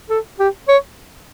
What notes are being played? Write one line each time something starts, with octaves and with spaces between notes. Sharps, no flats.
A4
G4
C#5